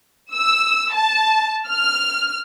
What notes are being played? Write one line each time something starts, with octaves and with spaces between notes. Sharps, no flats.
E6
A5
F6